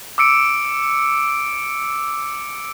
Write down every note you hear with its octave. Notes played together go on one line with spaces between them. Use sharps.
D6 E6 C#7 D7